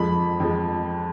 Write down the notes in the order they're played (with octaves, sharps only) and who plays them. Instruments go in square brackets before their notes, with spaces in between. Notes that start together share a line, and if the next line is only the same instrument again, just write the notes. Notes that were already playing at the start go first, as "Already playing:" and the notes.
Already playing: [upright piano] F2 F3 G#3 B5
F2 F3 G#3